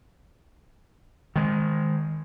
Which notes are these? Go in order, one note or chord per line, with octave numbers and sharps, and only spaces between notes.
D#3 G#3